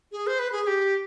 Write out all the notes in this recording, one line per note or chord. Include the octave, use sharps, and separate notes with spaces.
G#4
C5
B4
G#4
G#4
G4